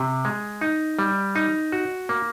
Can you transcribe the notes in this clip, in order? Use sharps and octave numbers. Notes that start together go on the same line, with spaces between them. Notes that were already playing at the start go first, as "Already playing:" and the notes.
Already playing: C3
G#3
D#4
G3
D#4
F#4
A#3